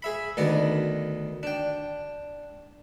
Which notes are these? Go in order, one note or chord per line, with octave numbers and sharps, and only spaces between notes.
G#4 E5 B5
D2 D#3 B3 D5 D#5
D4 G5